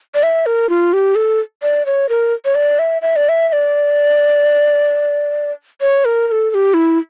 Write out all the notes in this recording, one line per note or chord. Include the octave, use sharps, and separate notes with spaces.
D5
E5
A#4
F4
G4
A4
D5
C#5
A#4
C#5
D5
E5
E5
D5
E5
E5
D5
C#5
A#4
A#4
A4
A4
G4
E4